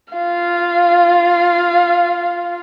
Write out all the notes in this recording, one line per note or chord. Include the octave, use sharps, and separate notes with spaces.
F4 F5